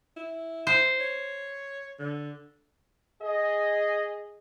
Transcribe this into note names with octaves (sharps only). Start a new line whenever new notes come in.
E4
C5
C#5
D3
G#4 D#5